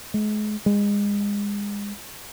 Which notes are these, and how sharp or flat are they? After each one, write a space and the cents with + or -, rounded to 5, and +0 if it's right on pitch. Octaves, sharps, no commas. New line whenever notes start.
G#3 +35
G#3 -30